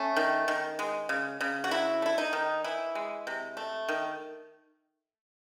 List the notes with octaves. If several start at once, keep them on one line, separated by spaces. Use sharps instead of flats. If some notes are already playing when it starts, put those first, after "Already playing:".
Already playing: A3 C#4
D#3
D#3
G#3
C#3
C#3
F#4
F#3 E4
A3 E4
D#4
D#3
E3 E4
G#3
C3
A3
D#3